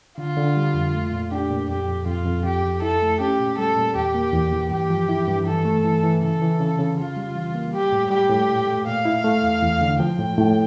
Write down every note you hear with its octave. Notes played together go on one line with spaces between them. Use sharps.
D3 F4
D3
G3
F2
A3
A#2
D4 G4
A#2
F2 G4
F2
F2 F4
F2
F2 G4
F2
E4 A4
A3
C#4 G4
A#2
G3 A4
A#2
E2 G4
A#3
E2
E3
G2 G4
F3
E4
G2
E3 A4
A3
E3
E3
C#3 A4
E3
C#3
C#3
C#3 F4
G3
E3
A#3
G3 G4
A2
G3 G4
A2
A#2
A3
A#2 F5
E4
A3
E2
E2
D3
F3 G5
A2
A2